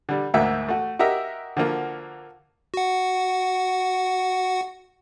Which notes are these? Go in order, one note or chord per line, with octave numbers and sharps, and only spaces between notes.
D3 G3
D2 G#2 A#3 F#4 E5
A3 F#4
F#4 G4 A#4 D#5 E5
D3 F3 A#3 F#4
F#4 F#5